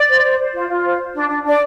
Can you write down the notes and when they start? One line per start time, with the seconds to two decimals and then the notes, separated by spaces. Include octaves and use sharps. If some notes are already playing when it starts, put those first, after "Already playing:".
Already playing: D5
0.09 C5
0.23 C5
0.39 C5
0.54 F4
0.68 F4
0.84 C5
0.98 C5
1.13 D4
1.28 D4
1.44 D4 D5